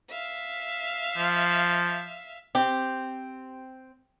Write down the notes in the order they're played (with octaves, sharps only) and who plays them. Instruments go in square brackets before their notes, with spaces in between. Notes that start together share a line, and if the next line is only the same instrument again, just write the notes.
[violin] E5 F5
[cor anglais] F3
[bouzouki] C4 [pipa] G4